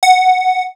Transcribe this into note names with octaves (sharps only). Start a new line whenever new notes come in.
F#5